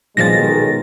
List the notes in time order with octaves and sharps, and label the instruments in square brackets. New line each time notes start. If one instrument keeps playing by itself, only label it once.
[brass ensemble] B1 D#3 [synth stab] G2 A#2 F3 [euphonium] G#3 [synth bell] A6 A#6